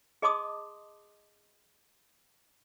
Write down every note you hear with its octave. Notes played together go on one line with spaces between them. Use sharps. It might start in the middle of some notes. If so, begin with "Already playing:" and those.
G#4 D#5 A5 C6 D6 D#6